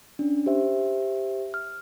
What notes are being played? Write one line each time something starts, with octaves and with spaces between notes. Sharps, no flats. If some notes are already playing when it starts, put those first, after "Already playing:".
C#4 D4
G4 C5 E5
F6